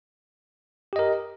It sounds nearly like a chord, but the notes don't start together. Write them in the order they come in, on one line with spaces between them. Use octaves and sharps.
G4 D#5 A#4